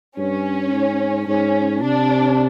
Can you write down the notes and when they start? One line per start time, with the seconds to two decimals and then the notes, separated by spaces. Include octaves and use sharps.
0.17 G2 C#4
0.72 G#2
1.27 G#2 C#4
1.82 C3 D4